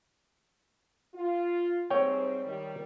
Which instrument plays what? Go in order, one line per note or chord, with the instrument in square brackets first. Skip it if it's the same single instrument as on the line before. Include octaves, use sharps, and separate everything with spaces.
[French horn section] F4
[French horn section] G#2 G3 C4 [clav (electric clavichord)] C#5 G5
[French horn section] D#3 G3